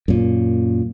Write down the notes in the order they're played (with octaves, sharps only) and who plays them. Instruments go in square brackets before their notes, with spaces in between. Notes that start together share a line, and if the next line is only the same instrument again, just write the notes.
[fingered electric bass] F#2 A#2